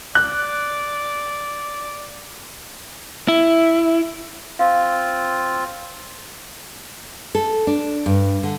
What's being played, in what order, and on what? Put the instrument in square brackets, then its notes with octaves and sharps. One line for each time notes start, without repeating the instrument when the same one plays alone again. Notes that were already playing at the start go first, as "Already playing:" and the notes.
[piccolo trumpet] D5 [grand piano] F#6
[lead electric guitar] E4
[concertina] C4 F4 [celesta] F5
[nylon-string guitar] A4
D4
G2
D3